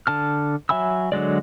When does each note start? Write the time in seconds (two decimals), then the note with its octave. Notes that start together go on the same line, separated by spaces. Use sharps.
0.07 D3 A5 F6
0.69 F#3 E5 G#5 B5 E6
1.12 D3 F#3 G#3 D5